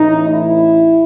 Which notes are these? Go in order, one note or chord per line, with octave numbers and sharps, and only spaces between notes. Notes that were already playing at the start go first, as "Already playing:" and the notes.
Already playing: A1 A2 E3 D#4
E4